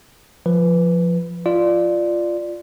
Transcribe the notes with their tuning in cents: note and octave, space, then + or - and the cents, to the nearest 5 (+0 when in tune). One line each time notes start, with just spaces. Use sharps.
F3 +0 B4 +0
F4 -10 D5 +10